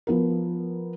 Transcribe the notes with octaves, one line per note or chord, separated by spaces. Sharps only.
F3 B3 A#4